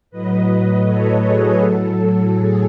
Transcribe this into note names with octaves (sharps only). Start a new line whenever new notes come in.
A2 F#3 B4 D#5
A4 C#5
G#4 B4
A2 F#3 A4
G#4